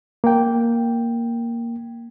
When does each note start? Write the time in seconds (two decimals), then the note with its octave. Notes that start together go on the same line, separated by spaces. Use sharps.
0.24 A#3 G5